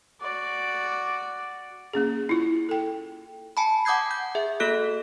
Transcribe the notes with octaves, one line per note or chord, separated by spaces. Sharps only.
F#4 D5
A#3 C#4 G#4
E4 F4
A4 G5
G#5 A5 B5
F#5 D6 D#6 G6 G#6 C7
G6
G#4 E5
A#3 F#4 A4 F#6